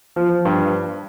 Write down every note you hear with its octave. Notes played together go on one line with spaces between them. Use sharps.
F3
G2